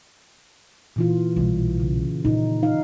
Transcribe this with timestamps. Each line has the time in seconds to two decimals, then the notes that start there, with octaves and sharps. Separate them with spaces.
0.96 A#2 E3 F4
1.36 B1 G3
1.80 C#3
2.25 A#2 D#3 D#4
2.63 D#4 F5